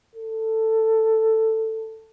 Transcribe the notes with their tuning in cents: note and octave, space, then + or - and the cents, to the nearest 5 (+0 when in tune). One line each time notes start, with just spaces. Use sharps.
A4 +10